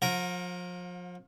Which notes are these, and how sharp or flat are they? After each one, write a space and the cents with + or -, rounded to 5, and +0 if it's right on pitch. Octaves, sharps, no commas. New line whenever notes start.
F3 +35 A#4 +0 F#5 -40